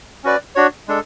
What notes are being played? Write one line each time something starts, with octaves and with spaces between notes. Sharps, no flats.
C#4 F#4 B4 D5
D4 F#4 C#5
G#3 D4 A4